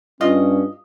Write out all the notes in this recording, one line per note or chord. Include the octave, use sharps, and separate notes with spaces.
G2 C#4 F4 D#5